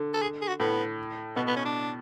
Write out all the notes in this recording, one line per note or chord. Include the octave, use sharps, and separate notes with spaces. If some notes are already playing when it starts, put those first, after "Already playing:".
Already playing: D3
A4
G#4
G#4
F#4
A2 B3
B2 B3
B3
C#4
D4